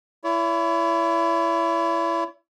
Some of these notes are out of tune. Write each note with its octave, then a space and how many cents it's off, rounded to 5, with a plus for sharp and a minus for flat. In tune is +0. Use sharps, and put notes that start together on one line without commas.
E4 +25 C#5 +40